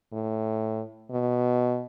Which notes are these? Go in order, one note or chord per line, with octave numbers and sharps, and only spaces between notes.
A2
B2